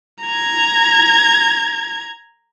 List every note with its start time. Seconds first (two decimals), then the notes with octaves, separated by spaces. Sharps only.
0.23 A#5 G#6